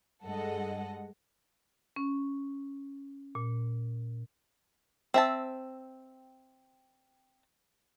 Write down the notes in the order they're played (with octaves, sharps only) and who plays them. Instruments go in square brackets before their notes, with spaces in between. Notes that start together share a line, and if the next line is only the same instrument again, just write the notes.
[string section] G2 G#3 A4 D#5 F#5
[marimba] C#4
A#2
[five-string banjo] C4 E5 A5